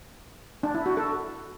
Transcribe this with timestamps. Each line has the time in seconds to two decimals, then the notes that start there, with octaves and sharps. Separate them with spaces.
0.63 D4
0.75 E4
0.86 F#4
0.97 A4